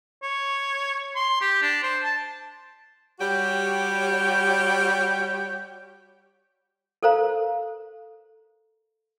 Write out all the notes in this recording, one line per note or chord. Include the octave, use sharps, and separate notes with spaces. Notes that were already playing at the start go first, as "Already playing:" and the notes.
C#5
C6
G4
D4
C5
A5
G3 F#4 G4 C#5
A4 A#4 C5 F5 A#5